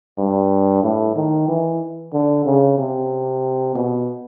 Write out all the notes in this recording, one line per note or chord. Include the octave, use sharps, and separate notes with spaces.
G2
A2
D#3
E3
D3
C#3
C3
B2